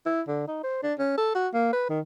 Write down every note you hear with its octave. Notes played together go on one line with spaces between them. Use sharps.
E4
D3
D#4
C5
D4
C#4
A4
F#4
A#3
B4
D#3